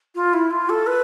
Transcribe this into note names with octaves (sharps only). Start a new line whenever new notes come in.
F4
E4
F4
A4
B4